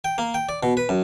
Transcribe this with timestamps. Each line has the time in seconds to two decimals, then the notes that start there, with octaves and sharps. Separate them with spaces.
0.04 G5
0.18 A#3
0.34 G5
0.49 D5
0.63 B2
0.77 B4
0.89 F#2